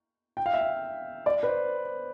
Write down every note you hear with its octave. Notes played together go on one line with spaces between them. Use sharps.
G5
F5
E5
F5
D5
B4
C5